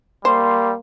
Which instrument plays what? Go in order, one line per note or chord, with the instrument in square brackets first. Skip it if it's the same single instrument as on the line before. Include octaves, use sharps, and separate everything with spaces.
[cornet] G3 [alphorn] A#3 [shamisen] C5 [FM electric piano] C6